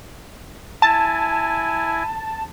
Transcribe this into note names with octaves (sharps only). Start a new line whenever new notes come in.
E4 G#5 A5